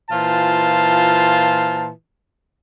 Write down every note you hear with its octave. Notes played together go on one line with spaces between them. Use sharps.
A#2 E3 F4 C5 A5